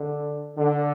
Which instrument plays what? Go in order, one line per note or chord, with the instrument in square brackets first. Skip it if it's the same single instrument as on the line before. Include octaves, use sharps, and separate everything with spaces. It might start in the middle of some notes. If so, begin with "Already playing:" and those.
Already playing: [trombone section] D3
D3